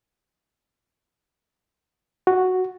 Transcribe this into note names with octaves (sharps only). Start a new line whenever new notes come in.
F#4